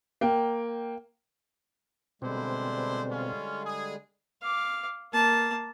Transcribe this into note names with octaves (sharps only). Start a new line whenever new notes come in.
A#3 G5
B2 D3 G3 G#3 C4 D4 E4 C5
C#4 F4
G#4
F5 D6
A#3 A5